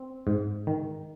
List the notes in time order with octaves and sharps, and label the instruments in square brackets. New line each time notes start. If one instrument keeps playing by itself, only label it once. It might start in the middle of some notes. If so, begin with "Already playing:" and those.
Already playing: [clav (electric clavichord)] C4
G#2
D#3